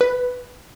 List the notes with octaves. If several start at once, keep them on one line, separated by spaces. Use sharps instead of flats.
B4